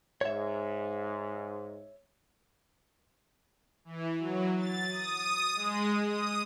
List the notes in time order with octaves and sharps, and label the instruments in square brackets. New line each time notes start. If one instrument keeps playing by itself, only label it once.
[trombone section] G#2 [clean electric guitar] C#5 E5
[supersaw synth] E3
F#3
A6
D#6
G#3
D#6